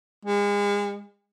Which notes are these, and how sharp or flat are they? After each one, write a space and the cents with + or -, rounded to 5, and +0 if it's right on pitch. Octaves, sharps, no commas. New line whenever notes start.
G#3 -35